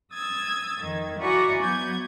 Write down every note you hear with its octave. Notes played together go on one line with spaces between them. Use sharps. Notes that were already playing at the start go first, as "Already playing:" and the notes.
D#6 E6 G#6 A6
F2 D#3
E4 F#4 D5 G#5 A#5 C#6
F#3 B3 G6 G#6